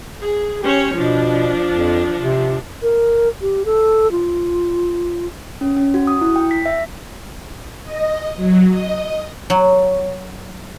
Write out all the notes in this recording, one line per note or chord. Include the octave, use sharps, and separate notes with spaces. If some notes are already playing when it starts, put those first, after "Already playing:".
G#4
C#4 G4 C5 C#5
B2 F3 D4
F2
C3
A#4
G4
A4
F4
C#4
C#4
F#4
D#6
E4
G5
B6
E5
D#5
F#3
D#5
F#3